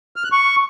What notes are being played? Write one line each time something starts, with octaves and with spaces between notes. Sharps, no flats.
F6
F#6
C#6